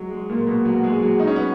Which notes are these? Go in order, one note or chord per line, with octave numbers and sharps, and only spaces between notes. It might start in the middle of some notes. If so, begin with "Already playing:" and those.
Already playing: F#3 G#3
G#3
A#2 A#3
B2 B3
F#3 F#4
G#3 G#4
F#3 F#4
D#4
C#4
B3